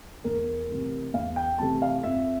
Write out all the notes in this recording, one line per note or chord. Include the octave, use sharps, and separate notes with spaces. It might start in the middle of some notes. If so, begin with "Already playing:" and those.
E2 A#4
C3 E3 A3
E2 F5
G5
C3 E3 A3 A5
F5
F2 E5